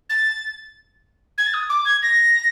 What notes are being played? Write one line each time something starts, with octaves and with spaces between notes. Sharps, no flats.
A6
G#6
A6
D#6
D6
G#6
A#6